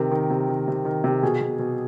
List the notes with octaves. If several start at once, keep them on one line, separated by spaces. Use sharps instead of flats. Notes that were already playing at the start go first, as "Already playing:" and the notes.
Already playing: C3 D#3 A#4
D#3
C3
D#3
C3
D#3
C3
B2 G#4
B2
B2